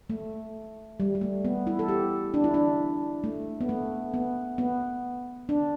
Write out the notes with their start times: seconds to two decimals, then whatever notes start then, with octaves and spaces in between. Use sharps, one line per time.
0.10 A3
1.00 G3
1.15 G3
1.21 A3
1.45 B3
1.67 E4
1.79 A4
1.89 G4
2.34 D4
2.44 E4
2.54 D4
3.24 A3
3.61 B3
3.69 A3
4.14 B3
4.58 B3
5.49 D4